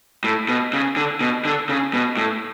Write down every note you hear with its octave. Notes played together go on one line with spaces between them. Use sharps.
A2
B2
C#3
D3
B2
D3
C#3
B2
A2